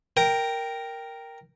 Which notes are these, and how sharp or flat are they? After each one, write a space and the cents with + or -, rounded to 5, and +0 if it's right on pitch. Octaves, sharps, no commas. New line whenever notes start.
A#4 +0 G5 +0